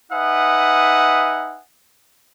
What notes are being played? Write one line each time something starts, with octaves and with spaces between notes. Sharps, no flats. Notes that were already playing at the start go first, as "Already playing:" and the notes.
D#4 B4 E5 F#5 G#5 D#6